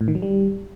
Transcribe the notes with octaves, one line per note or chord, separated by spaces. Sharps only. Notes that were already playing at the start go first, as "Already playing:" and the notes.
A2
D#3
F#3
G3